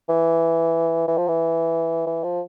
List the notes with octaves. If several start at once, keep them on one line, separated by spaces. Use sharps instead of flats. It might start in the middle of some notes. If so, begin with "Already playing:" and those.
E3
E3
F3
E3
E3
F3